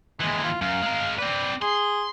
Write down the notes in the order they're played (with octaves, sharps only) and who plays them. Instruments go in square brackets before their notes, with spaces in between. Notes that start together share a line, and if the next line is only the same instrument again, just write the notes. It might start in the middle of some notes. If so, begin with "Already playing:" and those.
[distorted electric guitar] D#2 E3 [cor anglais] G#3
[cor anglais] F4
[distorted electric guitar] F#2 [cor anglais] F5
[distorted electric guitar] G#3 A#4
[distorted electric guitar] C4 B4 [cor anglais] D5
[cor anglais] G#4 [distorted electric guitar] C6